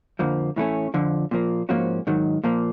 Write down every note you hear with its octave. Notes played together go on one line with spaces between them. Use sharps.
F2 D3 F3 A#3
A2 E3 A3 C#4
F2 D3 F3
A#2 F3 A#3
G#2 F3 A#3 C#4 F#4
G#2 D#3 F#3
A#2 F3 A#3